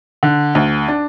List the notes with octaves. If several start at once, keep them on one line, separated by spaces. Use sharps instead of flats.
D3
D2
D4